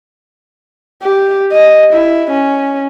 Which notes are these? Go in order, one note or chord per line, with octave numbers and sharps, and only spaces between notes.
G4
D#5
E4
C#4